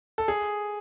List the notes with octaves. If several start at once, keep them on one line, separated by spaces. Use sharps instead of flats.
A4
G#4